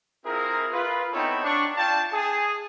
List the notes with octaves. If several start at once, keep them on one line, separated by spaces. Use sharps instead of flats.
C4 E4 F4 G#4 A#4
F4 B4
B3 C4 D#4 E4 A4 C#5
D4 C#6
D4 F4 G5 A5
G#4